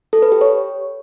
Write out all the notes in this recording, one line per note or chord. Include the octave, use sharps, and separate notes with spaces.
A4
B4
G4
C#5